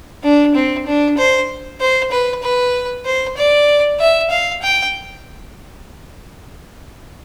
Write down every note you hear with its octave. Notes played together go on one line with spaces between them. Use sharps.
D4
C4
D4
C5
C5
B4
B4
C5
D5
E5
F5
G5